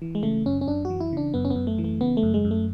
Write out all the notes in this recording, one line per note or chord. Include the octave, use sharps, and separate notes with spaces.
E3
G#3
C#3 A3
F#2 C#4
C#4
F#2 D4
F#4
E3
E4
C#3 D4
F#2 B3
C#4
B3
F#2
A3
E3
A3
C#3 B3
A3
F#2
G#3
F#2
A3